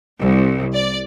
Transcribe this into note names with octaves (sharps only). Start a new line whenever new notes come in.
C2
D5